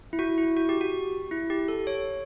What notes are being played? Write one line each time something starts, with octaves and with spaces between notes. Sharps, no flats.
E4
F#4
E4
F#4
G4
F#4
E4
G4
A4
C#5